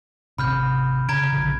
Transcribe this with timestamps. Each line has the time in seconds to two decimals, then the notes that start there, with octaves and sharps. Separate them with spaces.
0.38 G#1 C3 B5 F6 G6
1.09 C#3 A#5 G#6 D7
1.33 A#1 D3